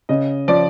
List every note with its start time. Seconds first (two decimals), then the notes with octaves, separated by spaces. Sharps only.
0.09 C#3 D#5
0.48 F3 D5